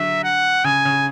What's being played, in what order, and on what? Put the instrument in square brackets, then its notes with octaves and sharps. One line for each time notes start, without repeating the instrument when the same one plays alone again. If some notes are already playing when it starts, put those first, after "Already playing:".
Already playing: [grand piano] D3 F#3 [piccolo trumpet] E5
[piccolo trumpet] F#5
[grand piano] C#3 [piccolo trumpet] G#5
[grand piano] C#3